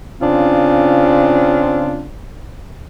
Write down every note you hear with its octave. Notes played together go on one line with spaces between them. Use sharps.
C#3 C4 D4 F4